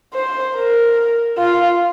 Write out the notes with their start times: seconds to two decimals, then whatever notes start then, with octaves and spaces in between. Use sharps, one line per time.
0.14 C5
0.55 A#4
1.38 F4